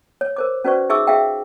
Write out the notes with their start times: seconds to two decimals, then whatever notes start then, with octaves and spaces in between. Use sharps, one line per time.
0.21 C#5
0.36 A#4 C5 D6
0.64 C#4 F#4 B4 C5 D5 C#6
0.89 D#4 G#4 E5 C#6 D6 E6
1.07 G#4 E5 F5 G5